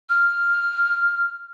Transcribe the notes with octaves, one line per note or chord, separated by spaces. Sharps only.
F6